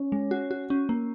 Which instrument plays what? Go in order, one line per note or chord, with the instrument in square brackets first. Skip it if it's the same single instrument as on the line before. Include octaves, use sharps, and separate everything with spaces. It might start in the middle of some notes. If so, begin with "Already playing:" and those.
Already playing: [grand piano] C#4
[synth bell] G#3
F#4
F#4
C#4
A#3